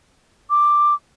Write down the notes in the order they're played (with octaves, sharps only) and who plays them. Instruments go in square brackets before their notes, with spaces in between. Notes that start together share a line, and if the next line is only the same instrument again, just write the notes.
[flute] D6